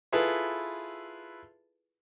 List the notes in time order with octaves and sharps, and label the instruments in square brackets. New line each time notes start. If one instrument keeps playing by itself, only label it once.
[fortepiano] E4 F4 G#4 A4 B4